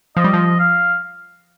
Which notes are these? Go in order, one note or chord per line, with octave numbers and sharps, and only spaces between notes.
F3 D#5
G3
F3
F5